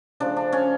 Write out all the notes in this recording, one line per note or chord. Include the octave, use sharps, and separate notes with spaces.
C#3 F3 A3 D4
D4
C#4